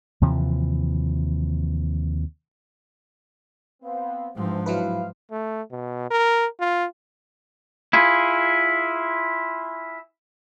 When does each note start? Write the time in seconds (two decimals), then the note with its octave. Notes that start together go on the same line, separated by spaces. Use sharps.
0.21 D#2 C3 E3 F3
3.83 B3 C4 F5
4.36 G#2 C3 E3 F3 C4 D4
4.66 F#3 E4 B4 F5
5.31 A3
5.71 B2
6.11 A#4
6.60 F4
7.93 E4 F4 G#4